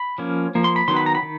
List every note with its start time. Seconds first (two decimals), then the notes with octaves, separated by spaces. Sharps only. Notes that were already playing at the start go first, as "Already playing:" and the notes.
Already playing: B5
0.18 F3 A#3 C#4
0.55 F3 A#3
0.64 C6
0.76 B5
0.88 D#3 F#3 B3 C6
0.96 B5
1.06 A#5
1.15 B5
1.23 D#3